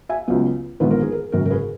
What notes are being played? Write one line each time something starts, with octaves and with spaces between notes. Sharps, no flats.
E5 G#5
C#2 C#3 F#3 B3
A#1 G#2 D#3 G#3 B3 B4
A#4
G#4
A#4
G#1 F#2 C#3 A#4
A#4
G#4 B4